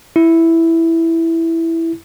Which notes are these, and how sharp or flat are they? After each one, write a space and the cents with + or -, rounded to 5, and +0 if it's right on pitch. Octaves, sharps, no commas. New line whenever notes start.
E4 +0